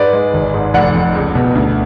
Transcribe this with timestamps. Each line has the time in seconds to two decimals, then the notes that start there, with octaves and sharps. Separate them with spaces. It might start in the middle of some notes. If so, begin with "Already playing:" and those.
Already playing: G#2 B4 D5
0.13 G#3
0.34 G#1
0.54 G#2
0.74 F1 D5 F#5
0.94 F2
1.15 C#2
1.35 B2
1.55 D2